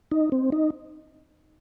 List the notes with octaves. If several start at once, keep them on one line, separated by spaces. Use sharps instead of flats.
D#4
C4
D#4